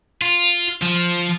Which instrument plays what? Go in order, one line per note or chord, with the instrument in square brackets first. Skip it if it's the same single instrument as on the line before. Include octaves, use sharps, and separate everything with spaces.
[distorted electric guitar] F4
F3